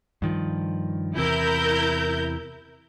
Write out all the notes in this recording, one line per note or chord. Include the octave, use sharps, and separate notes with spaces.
G2 D#3 F3
E2 C3 E3 E4 A#4 G6